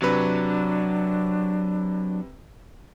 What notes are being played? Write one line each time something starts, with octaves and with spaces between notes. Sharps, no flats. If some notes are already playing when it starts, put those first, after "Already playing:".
C3 F#3 D4 B4